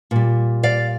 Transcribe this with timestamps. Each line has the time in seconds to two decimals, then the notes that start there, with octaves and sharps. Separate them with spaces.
0.11 A#2 G3
0.63 D5 F5